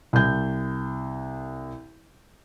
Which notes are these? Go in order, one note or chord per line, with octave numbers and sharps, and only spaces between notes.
C2 G6